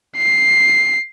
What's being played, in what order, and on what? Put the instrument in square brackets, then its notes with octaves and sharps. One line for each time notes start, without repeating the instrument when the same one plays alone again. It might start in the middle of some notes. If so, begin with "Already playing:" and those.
[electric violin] C7